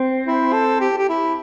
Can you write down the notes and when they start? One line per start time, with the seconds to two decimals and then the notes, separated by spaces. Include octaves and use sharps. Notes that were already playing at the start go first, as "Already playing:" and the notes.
Already playing: C4
0.26 E4
0.53 A4
0.81 G4
0.98 G4
1.09 E4